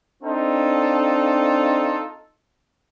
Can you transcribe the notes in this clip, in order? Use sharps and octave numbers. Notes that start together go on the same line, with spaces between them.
C4 D4 D#4 F4 A4